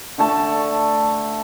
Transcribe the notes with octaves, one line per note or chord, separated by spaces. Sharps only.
D3 A3 A5